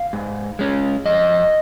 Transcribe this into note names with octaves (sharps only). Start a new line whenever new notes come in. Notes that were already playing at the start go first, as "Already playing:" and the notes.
Already playing: F5
G#2
G#3 C#4
F2 D#5